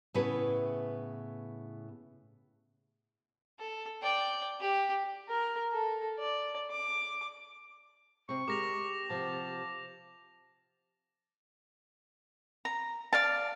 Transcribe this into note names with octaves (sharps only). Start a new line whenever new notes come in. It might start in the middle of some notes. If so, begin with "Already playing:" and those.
A2 C#3 B3 E4 G#4 B4
A4
D5 G5
G4
A#4
A4
D5
D6
C3 C4 C#6
G#3 G4 A#4 D6 A#6 F7
C3 F3 B3 A5
A#5
D5 F5 A5